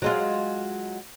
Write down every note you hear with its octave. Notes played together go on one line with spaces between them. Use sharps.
F#3 G#3 F4